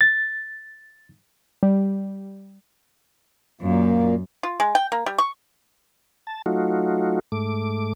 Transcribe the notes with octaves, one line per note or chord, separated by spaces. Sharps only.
A6
G3
F#2 A#2 A#3
F4
G#3
G5
A#3
G3
C#6
A5
F#3 A3 D#4 F4 F#4
G#2 A3 D6